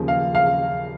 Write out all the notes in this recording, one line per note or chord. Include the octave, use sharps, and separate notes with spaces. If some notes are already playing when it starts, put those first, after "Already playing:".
Already playing: D#2 C#3 F3
F5
F5